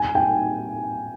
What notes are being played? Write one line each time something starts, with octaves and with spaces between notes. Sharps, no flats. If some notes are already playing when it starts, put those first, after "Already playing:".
Already playing: G#5
G5